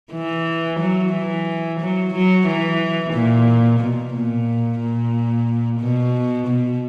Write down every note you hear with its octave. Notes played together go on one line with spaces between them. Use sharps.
E3
F#3
E3
F#3
F#3
E3
A#2
B2
A#2
A#2
B2
B2